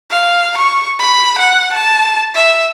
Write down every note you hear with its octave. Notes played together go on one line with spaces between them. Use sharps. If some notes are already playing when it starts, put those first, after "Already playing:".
F5
C#6
B5
F#5
A5
E5